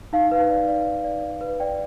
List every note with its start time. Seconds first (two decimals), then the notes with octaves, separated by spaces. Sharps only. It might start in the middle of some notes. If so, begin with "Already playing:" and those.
0.13 D#4 F5
0.31 B4
0.50 D5
0.68 D5
0.86 D#4
1.04 D5
1.23 D5
1.41 B4
1.60 D5 G5